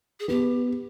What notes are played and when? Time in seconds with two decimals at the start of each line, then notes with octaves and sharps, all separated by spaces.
0.20 G#4
0.28 B3 G4